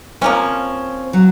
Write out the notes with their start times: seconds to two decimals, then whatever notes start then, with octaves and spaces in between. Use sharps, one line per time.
0.21 F3 A#3 C4 C#4
1.13 F#3